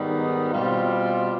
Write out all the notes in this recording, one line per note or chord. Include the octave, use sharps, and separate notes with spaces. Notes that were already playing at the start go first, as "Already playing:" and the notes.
Already playing: G#2 D#3 G3 B3 D#4
B2 G3 C4 F4